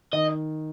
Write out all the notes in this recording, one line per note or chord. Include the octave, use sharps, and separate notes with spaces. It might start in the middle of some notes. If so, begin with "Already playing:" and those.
D#3 D#5